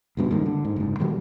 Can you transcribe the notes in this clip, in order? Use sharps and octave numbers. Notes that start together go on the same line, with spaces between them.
C#2 G2 B2
C#2 G2 D#3 A#3
D3
G#2
F#1 G#2
A#2 D#3 F#3 G3